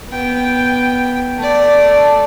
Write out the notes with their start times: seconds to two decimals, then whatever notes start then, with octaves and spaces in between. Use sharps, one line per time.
0.10 B3 G5
1.37 A3 D5